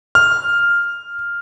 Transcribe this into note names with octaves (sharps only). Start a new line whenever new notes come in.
F6